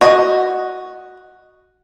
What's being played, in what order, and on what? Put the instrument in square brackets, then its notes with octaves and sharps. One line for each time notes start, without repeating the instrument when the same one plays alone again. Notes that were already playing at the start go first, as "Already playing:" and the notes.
[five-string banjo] F#4 D#5